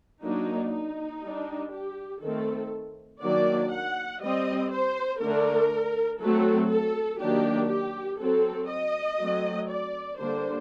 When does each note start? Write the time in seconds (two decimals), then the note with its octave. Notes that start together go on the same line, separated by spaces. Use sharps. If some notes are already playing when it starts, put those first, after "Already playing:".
0.23 F#3 A#3 D4 D#4
0.73 D#4
1.22 G3 D4
1.72 G4
2.21 D#3 A3 C4 A4
3.22 D#3 F#3 A#3 D4 D5
3.72 F#5
4.21 G3 C4 D#5
4.72 C5
5.21 D3 A3 D4 A#4
6.20 F#3 A3 C4 A4
6.70 A4
7.20 D#3 F#3 A#3 D4 G4
7.69 G4
8.19 F#3 C4 A4
8.70 D#5
9.20 F#3 A3 C4
9.70 D5
10.18 D3 G3 A#3 D4 C5